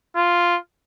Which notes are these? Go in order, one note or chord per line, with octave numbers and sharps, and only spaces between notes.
F4